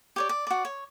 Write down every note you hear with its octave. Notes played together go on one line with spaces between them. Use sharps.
G4 C#5 D5
D5
F#4 D5
C#5